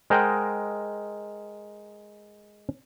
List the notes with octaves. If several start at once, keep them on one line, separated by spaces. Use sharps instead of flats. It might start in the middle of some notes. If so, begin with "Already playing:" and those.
G#3 A#4 C5 D#5 F#5 G5